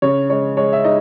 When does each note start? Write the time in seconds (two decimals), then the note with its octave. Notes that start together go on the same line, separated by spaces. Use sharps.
0.02 C#3 C#5
0.30 G#3 C#5
0.57 G#3 C#5
0.73 E5
0.85 G#3 D#4 D#5